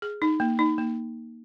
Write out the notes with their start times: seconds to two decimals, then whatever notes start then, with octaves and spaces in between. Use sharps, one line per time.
0.02 G#4
0.22 D#4
0.40 A#3
0.59 D#4
0.78 A#3